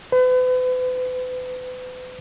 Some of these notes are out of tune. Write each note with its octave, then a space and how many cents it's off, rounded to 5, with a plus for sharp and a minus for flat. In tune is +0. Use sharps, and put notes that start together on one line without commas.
B4 +40